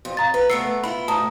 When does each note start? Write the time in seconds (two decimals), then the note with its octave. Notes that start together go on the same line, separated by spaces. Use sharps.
0.05 F2
0.17 F5 A#5 A6
0.34 B4
0.50 A3 B3 A#4 E6 C7 C#7
0.84 E4 F4 B5
1.08 A2 A5 A#5 D#6